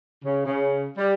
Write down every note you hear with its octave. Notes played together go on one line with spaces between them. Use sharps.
C#3
C#3
G3